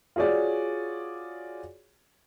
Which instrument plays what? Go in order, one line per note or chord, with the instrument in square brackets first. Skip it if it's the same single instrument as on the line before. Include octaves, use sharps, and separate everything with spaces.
[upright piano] F4 F#4 G#4 C#5 D5